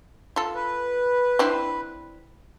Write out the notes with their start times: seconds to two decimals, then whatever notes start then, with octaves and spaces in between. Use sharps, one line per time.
0.36 F4 A4
0.55 B4
1.39 C4 D4 E4